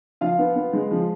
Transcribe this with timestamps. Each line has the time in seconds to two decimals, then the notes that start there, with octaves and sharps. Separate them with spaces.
0.21 F3 F4 F5
0.39 B3
0.56 B3
0.73 G#3
0.91 F3